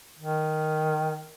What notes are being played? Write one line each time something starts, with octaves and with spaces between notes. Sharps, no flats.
D#3